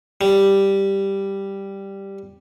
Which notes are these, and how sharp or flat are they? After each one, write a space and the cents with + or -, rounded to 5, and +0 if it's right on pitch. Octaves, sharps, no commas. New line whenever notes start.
G3 +0